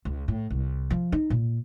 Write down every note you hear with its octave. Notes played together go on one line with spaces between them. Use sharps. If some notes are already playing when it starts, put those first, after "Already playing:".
C#2
A2
C2
F3
D#4
A#2